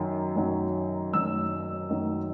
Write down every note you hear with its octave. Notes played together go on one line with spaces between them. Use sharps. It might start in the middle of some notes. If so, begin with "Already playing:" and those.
Already playing: F#2 D#3 F#3
F#2 D#3 F#3
F#2 D#3 F#3 E6
F#2 D#3 F#3